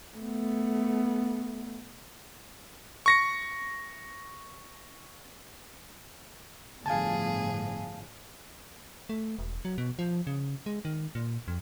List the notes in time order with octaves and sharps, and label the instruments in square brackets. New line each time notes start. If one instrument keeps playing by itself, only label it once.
[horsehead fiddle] A3 B3
[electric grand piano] C#6 A#6 C#7
[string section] G1 A2 [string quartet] F3 G#4 [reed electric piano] F5 G#5 A5
[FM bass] A3
E1
F#3
B2
F3
C#3
G#3
D#3
A#2
F2